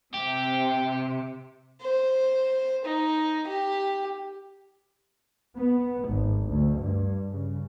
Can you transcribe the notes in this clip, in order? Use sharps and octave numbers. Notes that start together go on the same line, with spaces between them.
C3 G4
C5
D#4
G4
B3
G#1
D2
G2
C#3